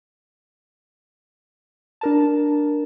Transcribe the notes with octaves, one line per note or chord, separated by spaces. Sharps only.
D4 A#4 A5